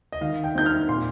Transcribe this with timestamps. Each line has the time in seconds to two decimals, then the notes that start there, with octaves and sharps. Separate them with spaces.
0.12 D#5
0.21 D#3 F5
0.44 G5
0.55 C4 D#4 G6
0.66 F6
0.89 A#2 C6